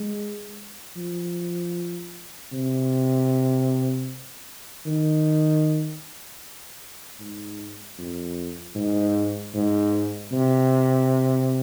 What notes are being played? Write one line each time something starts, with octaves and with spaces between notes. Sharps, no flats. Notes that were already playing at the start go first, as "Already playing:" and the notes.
Already playing: G#3
F3
C3
D#3
G#2
F2
G#2
G#2
C3